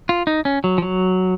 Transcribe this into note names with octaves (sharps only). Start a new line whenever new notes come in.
F4
D#4
C#4
F#3
F3
F#3